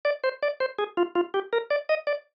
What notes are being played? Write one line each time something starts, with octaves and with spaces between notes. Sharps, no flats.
D5
C5
D5
C5
G#4
F4
F4
G4
A#4
D5
D#5
D5